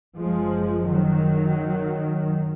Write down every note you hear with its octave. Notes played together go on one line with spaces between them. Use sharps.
F#1 F#2 F3 G#3
D#3 F#3